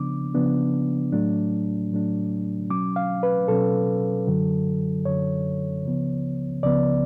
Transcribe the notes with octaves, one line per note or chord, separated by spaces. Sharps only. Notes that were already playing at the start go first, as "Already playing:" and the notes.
Already playing: C#3 F3 B3 D4 D6
C#3 F3 B3 D4
A2 F#3 A3 D4
A2 F#3 A3 D4
B2 F#3 C#4 D6
F5
B4
B2 F#3 C#4 A4
F#2 D3 F#3
F#2 D3 F#3 C#5
C#2 C#3 F3 B3
C#2 C#3 F3 B3 D5